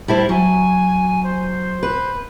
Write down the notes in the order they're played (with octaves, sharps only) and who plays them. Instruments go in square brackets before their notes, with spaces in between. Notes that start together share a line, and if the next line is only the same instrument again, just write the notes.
[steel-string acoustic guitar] G3 E4 C5 [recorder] A5
[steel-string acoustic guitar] F#3 [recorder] G#5
[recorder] C5
[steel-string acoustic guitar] B4